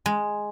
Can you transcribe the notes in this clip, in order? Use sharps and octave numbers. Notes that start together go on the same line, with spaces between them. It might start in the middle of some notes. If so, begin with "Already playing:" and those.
G#3